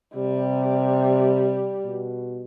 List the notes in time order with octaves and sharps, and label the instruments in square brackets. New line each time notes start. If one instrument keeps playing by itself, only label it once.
[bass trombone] C3 [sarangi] G3
[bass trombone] B2